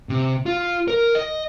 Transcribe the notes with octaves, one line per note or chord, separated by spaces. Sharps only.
C3
F4
A#4
D#5